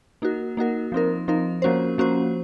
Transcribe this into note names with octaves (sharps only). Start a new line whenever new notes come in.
A#3 D#4 F#4 A#4
A#3 D#4 F#4 A#4
F3 C4 D#4 A#4
F3 C4 D#4 A#4
F3 A#3 C#4 F#4 C5
F3 A#3 C#4 F#4 C5